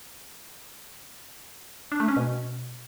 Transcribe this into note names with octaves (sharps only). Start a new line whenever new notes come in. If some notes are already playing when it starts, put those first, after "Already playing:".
D4
A3
C#4
B2